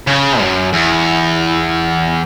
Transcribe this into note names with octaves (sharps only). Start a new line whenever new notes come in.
C#3
F#2
E2